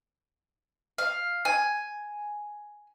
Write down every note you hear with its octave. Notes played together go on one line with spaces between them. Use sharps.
F5
G#5